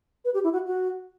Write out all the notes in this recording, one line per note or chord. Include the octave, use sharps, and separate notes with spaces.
B4
G4
E4
F#4
F#4